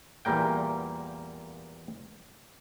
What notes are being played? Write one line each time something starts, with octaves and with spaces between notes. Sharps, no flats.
E2 A#2 G3 A#3 G5